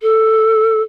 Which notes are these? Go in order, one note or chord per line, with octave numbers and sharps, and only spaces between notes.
A4